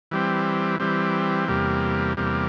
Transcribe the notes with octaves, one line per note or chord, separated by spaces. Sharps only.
E3 G3 C4
E3 G3 C4
E2 C3 G3 A#3
E2 C3 G3 A#3